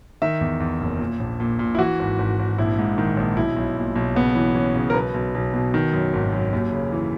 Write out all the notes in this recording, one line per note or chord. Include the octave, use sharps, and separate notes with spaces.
D#3 E5
E2
E2
F#1
A#2
A#1
A#2
A#2
E4
E3 F#4
G#1
G#1
G#1
A#1 E4
G#2
D#3
A#1
B1 E4
B1
A#2
B1
C#3 B3
E3
E3 C#4
C#3
A#4
B1 B4
B1
B1
B2
D#3
F#2
G#1
F#2
D#2
C#3
E3